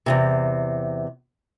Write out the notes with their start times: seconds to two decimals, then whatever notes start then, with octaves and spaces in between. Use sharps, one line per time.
0.06 E2 G#2 C3